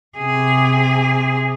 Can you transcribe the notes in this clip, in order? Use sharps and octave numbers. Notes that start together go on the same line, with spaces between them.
C3 G#4